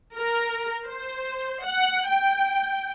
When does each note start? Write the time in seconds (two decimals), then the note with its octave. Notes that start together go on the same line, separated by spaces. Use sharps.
0.17 A#4
0.85 C5
1.64 F#5
2.09 G5